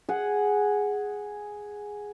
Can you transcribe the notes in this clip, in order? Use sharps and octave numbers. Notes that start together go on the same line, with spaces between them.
G#4 F#5